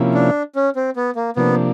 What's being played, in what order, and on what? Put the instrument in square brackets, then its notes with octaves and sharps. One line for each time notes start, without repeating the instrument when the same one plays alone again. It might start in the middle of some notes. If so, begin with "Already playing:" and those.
Already playing: [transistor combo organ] C3 F3 A#3 C#4 E4
[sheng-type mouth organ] D4
C#4
C4
B3
A#3
[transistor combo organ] C3 F3 A#3 D4 [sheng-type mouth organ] B3